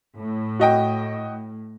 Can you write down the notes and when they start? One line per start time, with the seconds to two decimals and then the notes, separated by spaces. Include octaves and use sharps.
0.16 A2
0.60 F#4 D#5 G5